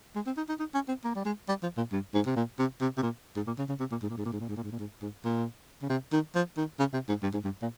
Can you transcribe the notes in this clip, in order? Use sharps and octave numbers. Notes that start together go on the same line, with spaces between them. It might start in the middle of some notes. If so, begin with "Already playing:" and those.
G#3
C4
D#4
D#4
D#4
C#4
C4
A#3
G3
G#3
G3
F3
A#2
G2
G#2
C3
A#2
C3
C3
C3
A#2
G#2
A#2
C#3
C#3
C3
A#2
G#2
A#2
G#2
A#2
G#2
A#2
G#2
A#2
G#2
A#2
G#2
G#2
A#2
C#3
C3
D#3
F3
D#3
C#3
C3
G#2
G2
G#2
G2
A#2